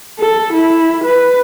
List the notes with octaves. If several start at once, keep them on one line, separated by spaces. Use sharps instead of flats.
A4
E4
B4